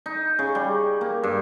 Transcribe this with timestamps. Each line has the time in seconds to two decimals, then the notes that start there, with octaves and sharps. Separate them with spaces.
0.06 D#4
0.39 C#3
0.55 G3
1.01 A#3
1.23 G2